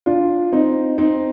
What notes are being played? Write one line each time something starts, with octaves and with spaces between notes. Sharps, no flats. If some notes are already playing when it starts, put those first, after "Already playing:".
D4 F4
C4 D#4
C4 D#4